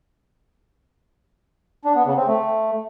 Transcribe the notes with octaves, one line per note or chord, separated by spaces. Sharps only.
D4
B3
C#3
C4
A3